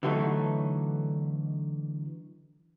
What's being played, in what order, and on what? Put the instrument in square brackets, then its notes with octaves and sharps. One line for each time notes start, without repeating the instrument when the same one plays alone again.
[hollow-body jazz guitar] D3 E3 F#3 A3 D#4